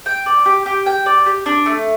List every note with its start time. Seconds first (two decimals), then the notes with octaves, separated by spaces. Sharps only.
0.06 G5
0.26 D5
0.46 G4
0.66 G4
0.86 G5
1.06 D5
1.26 G4
1.46 D4
1.66 A3